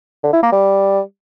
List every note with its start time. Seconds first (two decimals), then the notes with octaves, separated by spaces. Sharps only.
0.24 D3
0.33 E4
0.43 A#3
0.52 G3